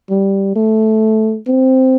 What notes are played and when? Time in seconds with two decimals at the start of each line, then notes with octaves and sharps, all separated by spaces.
0.10 G3
0.56 A3
1.47 C4